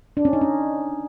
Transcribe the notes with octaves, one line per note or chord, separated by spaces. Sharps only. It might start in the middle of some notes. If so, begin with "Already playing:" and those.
D4
C#4
D#4
C#4